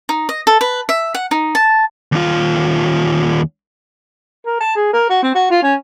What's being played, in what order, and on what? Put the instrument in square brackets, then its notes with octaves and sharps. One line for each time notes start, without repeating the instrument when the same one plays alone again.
[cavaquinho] D#4
D#5
A4
B4
E5
F#5
D#4
A5
[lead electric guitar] D#2 F4
[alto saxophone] A#4
A5
G#4
A#4
F#4
C4
F#4
F4
C#4